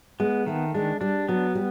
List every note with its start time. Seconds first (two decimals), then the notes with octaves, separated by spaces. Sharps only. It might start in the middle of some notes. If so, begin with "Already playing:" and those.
0.20 G#3 B3
0.46 D#3 A3
0.74 G#3 D4
1.01 G3 D4
1.29 F#3 B3
1.55 G3